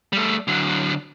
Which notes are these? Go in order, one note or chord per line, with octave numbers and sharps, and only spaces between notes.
G3 A3
D3 F#3